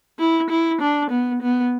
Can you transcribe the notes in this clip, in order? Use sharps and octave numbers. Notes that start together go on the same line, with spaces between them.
E4
E4
D4
B3
B3